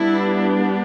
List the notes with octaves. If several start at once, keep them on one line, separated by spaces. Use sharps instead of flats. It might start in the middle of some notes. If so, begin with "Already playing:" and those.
Already playing: G3 B3 D4 E4